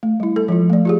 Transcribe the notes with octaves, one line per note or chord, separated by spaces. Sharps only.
A3
G3 E4
A4
F3 G#3 F4
A3 D5
F4 G4 G#4